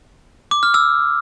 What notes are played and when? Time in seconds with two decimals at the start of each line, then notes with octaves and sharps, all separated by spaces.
0.51 D6
0.63 F6
0.74 E6